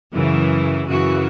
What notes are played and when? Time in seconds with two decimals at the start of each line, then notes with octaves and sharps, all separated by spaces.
0.14 F#2 C#3 E3
0.88 F#2 C#3 E3 F#4